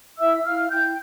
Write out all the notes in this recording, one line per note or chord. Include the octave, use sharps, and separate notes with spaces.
E4 E5 E6
E4 F5 F6
E4 G5 G6